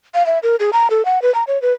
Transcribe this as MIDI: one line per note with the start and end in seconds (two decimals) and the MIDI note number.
0.15 0.25 77
0.26 0.39 76
0.43 0.56 70
0.60 0.70 68
0.73 0.87 82
0.90 1.05 69
1.05 1.21 78
1.22 1.33 71
1.35 1.44 82
1.47 1.60 73
1.62 1.73 71